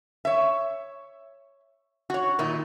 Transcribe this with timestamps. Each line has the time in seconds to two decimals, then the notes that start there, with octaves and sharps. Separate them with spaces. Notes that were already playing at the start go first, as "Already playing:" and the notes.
0.25 C#5 E5
2.10 F#4 C#5
2.39 A#2 D#3 D#4 E4